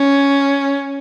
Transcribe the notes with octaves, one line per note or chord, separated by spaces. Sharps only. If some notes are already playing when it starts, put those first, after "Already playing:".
Already playing: C#4